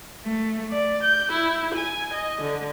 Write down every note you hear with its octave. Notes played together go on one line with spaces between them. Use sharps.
A3
D5
G6
E4
G#5
D#5
D3